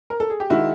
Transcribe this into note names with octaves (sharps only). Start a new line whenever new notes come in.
A#4
A4
G#4
G4
D#3 G#3 E4 F#4